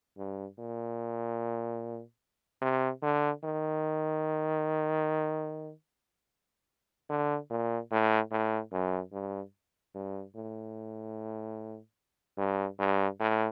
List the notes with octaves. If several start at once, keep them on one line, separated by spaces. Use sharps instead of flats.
G2
A#2
C3
D3
D#3
D3
A#2
A2
A2
F#2
G2
G2
A2
G2
G2
A2